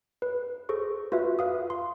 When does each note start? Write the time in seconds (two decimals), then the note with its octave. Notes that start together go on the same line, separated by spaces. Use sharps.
0.22 B4
0.69 G#4 A4 C5 C#6
1.12 F4 F#4 B4 E5
1.39 B4 F5 D#6
1.70 C6